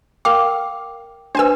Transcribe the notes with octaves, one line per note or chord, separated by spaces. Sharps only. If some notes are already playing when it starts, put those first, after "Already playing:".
A#4 F5 G5 D6
D4 B4 C5 G#5 E6